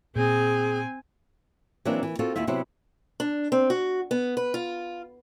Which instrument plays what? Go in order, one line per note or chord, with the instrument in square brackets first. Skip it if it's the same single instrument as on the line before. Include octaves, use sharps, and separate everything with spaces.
[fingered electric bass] A#2 [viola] C4 G#5 [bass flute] G#4
[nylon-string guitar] E3 F#3 A#3 C4 D4
E3
C4 F4 F#4 A4
D#2 E4 F4 E5
C3 F#3 B3 E4 C5
[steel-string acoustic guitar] D4
C4
F#4
B3
B4
F4